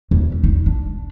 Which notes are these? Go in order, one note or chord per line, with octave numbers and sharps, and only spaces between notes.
E2
D#4
D4